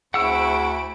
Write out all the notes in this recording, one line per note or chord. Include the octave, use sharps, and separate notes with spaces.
D2 C4 E4 G#4 F#5 C#6 E6 D7